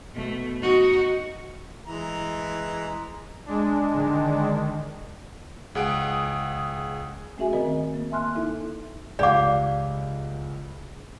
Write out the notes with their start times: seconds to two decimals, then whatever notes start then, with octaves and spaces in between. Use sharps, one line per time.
0.14 B2 A3
0.62 D#4 F#4
1.87 E3 G#3 A#5
3.46 G#3 D4
3.91 D3 D#3
5.75 C#2 G#4 F#5 D7
7.38 A3 C#4 F#4 G#4 E5 G#5
7.53 D#3 C4 A#4 D#5
7.94 A#3
8.11 E5 G#5 A5 C6 F6 F#6
8.35 D#4 E4 A4 E5
9.19 C#2 G4 D5 F5 F#5 D6